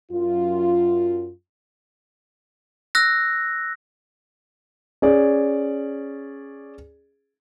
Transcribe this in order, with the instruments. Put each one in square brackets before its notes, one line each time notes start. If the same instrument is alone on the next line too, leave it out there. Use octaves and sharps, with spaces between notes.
[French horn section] F#2 F4
[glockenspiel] E6 F#6 A#6
[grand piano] C#4 G#4 D5